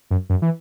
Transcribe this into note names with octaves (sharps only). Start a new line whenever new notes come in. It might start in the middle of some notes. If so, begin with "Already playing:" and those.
F#2
F#2
E3